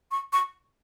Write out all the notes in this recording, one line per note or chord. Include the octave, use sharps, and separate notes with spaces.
C#6
C#6